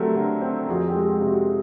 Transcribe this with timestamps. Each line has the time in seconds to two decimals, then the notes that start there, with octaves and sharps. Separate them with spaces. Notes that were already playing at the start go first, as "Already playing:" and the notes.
Already playing: D3 F#3 A3 C4 G4 A#4 B4
0.15 D3
0.42 C4
0.68 F2 F#4 G#4
0.88 G4
0.95 G#3
1.08 G4
1.20 C3 G4
1.28 F#4